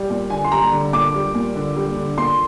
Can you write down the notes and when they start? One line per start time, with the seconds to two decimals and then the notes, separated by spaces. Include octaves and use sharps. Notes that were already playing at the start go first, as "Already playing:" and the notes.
Already playing: G3
0.10 A#2
0.30 D3 G#5
0.44 C6
0.51 G3 A#5
0.72 D3
0.93 A#2 D6
1.14 G3
1.34 A#2
1.55 D3
1.76 G3
1.97 D3
2.17 A#2 C6